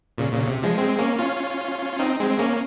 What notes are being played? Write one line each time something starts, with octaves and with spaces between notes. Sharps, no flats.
A#2 C#3
A#2 C#3
C3
F3 G#3
G#3 C4
A#3 C#4
C#4 F4
C4 D#4
G#3 C4
A#3 C#4